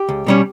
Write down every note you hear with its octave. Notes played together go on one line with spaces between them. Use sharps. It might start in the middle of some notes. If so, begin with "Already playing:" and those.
Already playing: G4
C#2
B2 G3 C#4